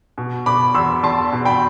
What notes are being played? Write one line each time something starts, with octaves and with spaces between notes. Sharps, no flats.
B2
B2 B5 D6
E2 C6 E6
E2 A5 C6
B2
G5 B5